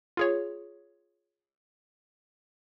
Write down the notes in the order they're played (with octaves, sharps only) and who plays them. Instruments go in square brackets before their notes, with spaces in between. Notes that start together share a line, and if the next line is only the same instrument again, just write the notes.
[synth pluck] F4 G#4 C#5